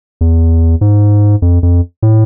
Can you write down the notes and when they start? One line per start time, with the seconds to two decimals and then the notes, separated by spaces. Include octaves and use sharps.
0.21 E2
0.81 G#2
1.42 F2
1.63 F2
2.03 A2